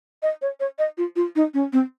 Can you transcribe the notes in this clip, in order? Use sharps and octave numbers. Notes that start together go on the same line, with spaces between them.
D#5
C#5
C#5
D#5
F4
F4
D#4
C#4
C4